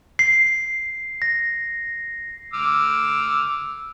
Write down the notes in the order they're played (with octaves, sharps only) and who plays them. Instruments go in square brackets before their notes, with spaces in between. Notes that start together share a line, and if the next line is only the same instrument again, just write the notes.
[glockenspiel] C7
A#6
[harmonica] D6 E6 F6